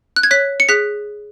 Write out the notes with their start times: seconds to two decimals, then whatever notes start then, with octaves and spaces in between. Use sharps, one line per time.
0.16 F#6
0.23 G#6
0.31 C#5 F#6 B6
0.60 C#7
0.69 G#4 F#6 B6